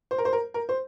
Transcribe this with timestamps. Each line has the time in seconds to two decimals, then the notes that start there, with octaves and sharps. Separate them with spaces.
0.11 C5
0.18 A#4
0.25 C5
0.33 A#4
0.54 A#4
0.69 C5